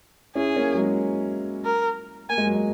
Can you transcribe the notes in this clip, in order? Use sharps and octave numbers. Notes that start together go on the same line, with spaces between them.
C#4 E4 G#4
A#3 C#4
F#3
G#3
A#4
A#3 G#5
G#3
F#3
G#3